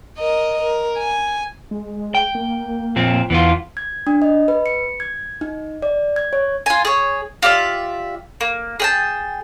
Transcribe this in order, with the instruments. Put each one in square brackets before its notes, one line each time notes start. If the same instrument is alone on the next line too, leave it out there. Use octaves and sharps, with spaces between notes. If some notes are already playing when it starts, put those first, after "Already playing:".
[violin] A#4 D#5
A#4
G#5
[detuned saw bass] G#3
[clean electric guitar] G5
[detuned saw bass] A#3
[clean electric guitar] A#2 F3 C4
[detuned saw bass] E2 [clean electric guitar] E3 B3 F4
[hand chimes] G#6
D4
D#5
B4
C#7
G#6
D#4
D5
G#6
C#5
[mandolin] F4 G#5
G#4 C#5
F4 G4 D5 E5
A#3
G#4 G5 A5